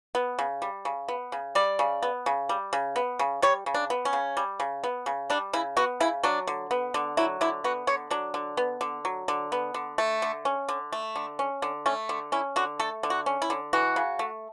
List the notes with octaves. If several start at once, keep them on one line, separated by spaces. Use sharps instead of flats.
B3
C#3
G3
C#3
B3
C#3
G3 D5
C#3
B3
C#3
G3
C#3
B3
C#3
G3 C#5
C#3
D4
B3
C#4
C#3
G3
C#3
B3
C#3
G3 D4
C#3 E4
B3 F#4
C#3 E4
F#3 D4
D3
B3
D3
F#3 E4
D3 E4
B3 F#4
D3 C#5
F#3 D4
D3
B3
D3
F#3
D3
B3
D3
A3
D3
C#4
D3
A3
D3
C#4
D3
A3 C#4
D3
C#4 E4
D3 F#4
A3 A4
D3
F#4
C#4
E4
D3
E3 F#4
C#3
A3